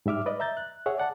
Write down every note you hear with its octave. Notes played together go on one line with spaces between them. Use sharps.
G#2 G3 E5 D6 F6
B4 D5 D#5
E5 A#5 G6 A6
F#6
G#4 C#5 E5 F#5
D5 F#5 A5